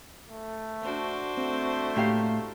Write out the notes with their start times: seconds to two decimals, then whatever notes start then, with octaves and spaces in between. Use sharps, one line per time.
0.28 A3
0.82 D4 F#4 C5
1.37 A3 C4
1.96 A2 A#3 G4 F5